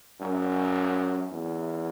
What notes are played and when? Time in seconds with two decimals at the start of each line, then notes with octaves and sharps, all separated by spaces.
0.21 F#2
1.32 E2